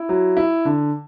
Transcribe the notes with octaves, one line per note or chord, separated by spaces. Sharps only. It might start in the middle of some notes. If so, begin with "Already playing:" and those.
Already playing: E4
F#3
E4
D3